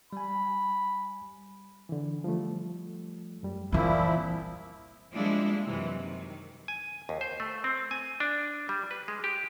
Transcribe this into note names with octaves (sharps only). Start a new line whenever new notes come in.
G3 G#5 B5
D3 E3
F3 G3 A3
F#2 G3
A#2 E3 F3 C4 E4
F3 G3 G#3 A#3 D4 E4
F#2 C3 E3
D#3
G#5
D#2
C5
A3
C4
G#5
D4
G3
B4
G#3
G4